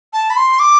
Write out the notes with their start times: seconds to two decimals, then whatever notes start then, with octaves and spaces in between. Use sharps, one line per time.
0.13 A5
0.30 B5
0.37 C6
0.59 D6